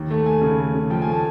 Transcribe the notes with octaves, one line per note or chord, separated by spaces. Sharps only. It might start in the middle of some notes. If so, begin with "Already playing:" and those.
Already playing: D#2
A3
A3 G#5
C#3
A3
C#3
F3 G5
G#5
A3 A5